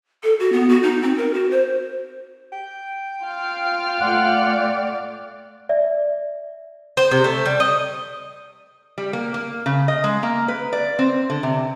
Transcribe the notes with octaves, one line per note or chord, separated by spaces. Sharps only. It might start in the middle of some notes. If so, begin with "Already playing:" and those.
A4
F#4
B3
F#4
D#4
C4
A#4
F#4
C5
G5
F4 F5 F6
A3 D5 F#5
D5 E5
C5
C3
A3
G3
D#5
G3
A#3
A#3
C#3
D#5
G#3
A#3
B4
D5
C4
D3
C3